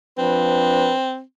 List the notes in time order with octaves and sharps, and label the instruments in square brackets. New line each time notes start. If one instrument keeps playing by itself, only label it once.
[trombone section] F3 D4 B4 [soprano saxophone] C4